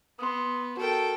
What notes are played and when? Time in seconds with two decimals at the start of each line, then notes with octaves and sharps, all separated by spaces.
0.19 B3 C6 D#6
0.77 F#4 A4 A#4 G5